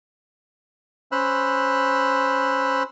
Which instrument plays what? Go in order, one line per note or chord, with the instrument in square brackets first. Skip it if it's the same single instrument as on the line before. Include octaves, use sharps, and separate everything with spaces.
[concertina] C#4 C5 B5 E6 F#6